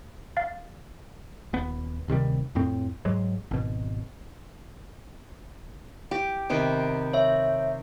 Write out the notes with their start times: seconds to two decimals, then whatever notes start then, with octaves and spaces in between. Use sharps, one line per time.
0.37 F5 A6
1.53 D#1 B3
2.08 D1 C3 D#3 G3
2.55 F2 A2 C4
3.05 G#2 F#3 G#3
3.51 G#1 B2
6.11 G4
6.50 C3 D#3 B3
7.13 C#5 E5